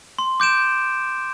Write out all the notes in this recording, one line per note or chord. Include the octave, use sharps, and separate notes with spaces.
C6
D6 G6 D7 E7